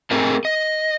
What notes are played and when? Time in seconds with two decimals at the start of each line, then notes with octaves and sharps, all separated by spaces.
0.11 A3 C4 G#4 A#4 D#5
0.45 D#5